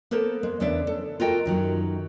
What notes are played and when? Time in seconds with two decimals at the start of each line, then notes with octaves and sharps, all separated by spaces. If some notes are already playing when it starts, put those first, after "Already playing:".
0.11 A#3 B3 A4 A#4 C5
0.43 G#3
0.60 E2 C#3 B3 D4 D5 E5
0.87 A4
1.20 F4 F#4 A4 A#4 D#5 G5
1.46 F#2 D#3 F#3